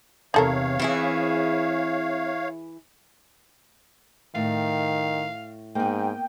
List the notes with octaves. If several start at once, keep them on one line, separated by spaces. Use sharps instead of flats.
E2 C3 D#4 A4 A#4 C#5 F5
E3 C4 E4 G#4
A2 D#3 F5
G#2 A#3 B3 G5